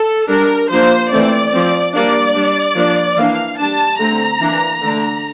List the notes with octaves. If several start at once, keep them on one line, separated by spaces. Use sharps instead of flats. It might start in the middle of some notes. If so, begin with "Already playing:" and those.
Already playing: A4
G3 D4 A#4
F3 A#3 D4 C5
E3 A3 C4 D5
F3 C4
G3 A#3 D4 D5
G3 D4
F3 A#3 D4
E3 A#3 D4 F5
G3 D4 A5
D3 A3 C4 A#5
E3 A#3 D4
D3 A3 D4